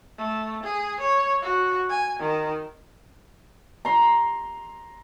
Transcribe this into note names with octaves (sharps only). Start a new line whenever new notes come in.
A3
G#4
C#5
F#4
G#5
D#3
A#5 C6